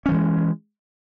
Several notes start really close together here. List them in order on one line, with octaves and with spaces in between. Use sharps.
C#4 F3 E3 G#3